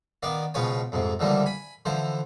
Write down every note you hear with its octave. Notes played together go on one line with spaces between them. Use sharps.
D#3 B3 D5 F5
C#2 B2 F3 B4 C#5 G#5
F2 G#2 C3
C#2 D3 E3 F3 G3 A#3
G#5 B5
D3 E3 F3 C5